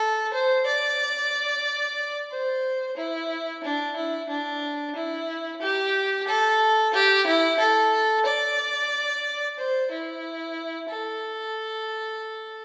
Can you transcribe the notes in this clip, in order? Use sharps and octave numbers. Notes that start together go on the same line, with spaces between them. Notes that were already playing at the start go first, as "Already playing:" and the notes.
Already playing: A4
C5
D5
C5
E4
D4
E4
D4
E4
G4
A4
G4
E4
A4
D5
C5
E4
A4